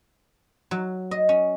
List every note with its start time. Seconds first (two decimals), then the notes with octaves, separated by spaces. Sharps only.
0.71 F#3
1.11 D#5
1.29 C#4